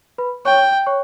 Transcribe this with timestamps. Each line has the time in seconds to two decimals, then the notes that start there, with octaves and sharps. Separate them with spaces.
0.18 B4 B5
0.45 C#5 G5 C#6
0.87 C#5 C#6